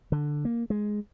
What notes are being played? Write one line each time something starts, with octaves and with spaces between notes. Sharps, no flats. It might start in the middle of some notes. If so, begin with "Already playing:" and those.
D3
A#3
G#3